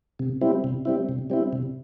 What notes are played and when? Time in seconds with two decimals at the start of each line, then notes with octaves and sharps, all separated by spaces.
0.19 C3
0.41 G3 C4 E4
0.64 C3
0.85 G3 C4 E4
1.09 C3
1.30 G3 C4 E4
1.53 C3